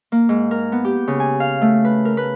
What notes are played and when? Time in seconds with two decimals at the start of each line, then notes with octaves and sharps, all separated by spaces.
0.12 A#3
0.29 G#2
0.51 A#4
0.72 B3
0.85 G4
1.08 C#3
1.20 G#5
1.40 F5
1.62 A3
1.85 B4
2.05 A#4
2.17 B4